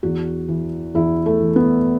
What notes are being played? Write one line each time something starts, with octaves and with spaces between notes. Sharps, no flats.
E2 F#4
E3
E2 E4
A3
E3
B3